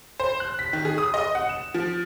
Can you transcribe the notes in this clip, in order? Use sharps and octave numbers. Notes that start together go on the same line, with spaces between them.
C5
F#6
B6
D#3
G#4
D#6
D#5
F#5
E7
F3